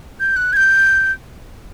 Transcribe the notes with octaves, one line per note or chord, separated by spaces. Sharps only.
G6
F#6
G#6
G6